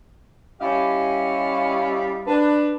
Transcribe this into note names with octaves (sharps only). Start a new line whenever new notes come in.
G3 C#4 E4 G4 D#5 F5
D4 B4